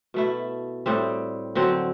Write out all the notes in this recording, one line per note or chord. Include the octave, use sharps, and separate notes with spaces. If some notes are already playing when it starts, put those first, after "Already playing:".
B2 A3 E4
A2 G3 C4
D3 F#3 C4